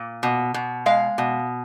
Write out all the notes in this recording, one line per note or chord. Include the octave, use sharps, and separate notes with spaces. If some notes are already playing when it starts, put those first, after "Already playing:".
Already playing: A#2
B2
B2
G#3 F5
B2